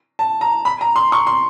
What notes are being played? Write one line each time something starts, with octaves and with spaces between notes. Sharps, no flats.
A5
A#5
B5
A#5
C6
C#6
C6